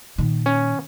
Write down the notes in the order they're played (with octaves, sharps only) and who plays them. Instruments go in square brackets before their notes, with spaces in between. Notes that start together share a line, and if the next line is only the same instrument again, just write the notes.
[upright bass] A#2 D#3
[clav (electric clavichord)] C#4